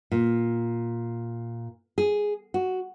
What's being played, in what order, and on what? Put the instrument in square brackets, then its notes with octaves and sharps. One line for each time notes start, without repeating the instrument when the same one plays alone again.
[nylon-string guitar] A#2
G#4
F#4